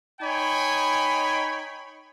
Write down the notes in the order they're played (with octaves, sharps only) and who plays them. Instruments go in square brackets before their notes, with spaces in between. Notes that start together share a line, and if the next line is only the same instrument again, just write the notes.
[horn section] D#4 C#5 G5 G#5 B5